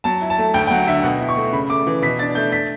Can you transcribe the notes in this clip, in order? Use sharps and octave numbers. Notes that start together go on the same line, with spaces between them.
F#3 A5
E4
A5
A3
D2 G5
G5
F#3 F#5
D3 E5
B2 F#5
E4
C#6
A3
C#3 B5
A3 D6
E3
B2 B6
D4 A6
A3 G6
B6